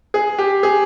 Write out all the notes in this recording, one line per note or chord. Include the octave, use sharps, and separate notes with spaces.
G#4
G4
G#4